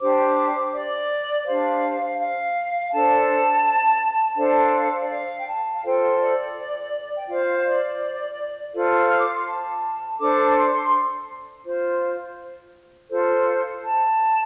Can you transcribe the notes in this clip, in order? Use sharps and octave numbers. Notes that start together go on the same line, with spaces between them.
D4 G4 C5 D6
D5
D4 G4 C5 F5
F5
D4 A4 C5 A5
D4 A4 C5 F5
D5
F5
G5
A5
F5
F4 A4 C5 G5
D5
G5
F4 C5 F5
D5
F4 A4 C5 F5
F6
D6
C6
A5
D4 A4 C5 D6
C6
F4 C5
F4 A4 C5
A5